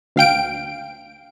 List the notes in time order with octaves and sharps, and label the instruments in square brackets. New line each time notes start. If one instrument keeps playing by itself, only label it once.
[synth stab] D2 F5 G5 D7